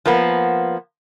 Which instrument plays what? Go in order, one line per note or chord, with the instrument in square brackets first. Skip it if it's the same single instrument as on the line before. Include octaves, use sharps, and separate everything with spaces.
[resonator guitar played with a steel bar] F3 A#3 B3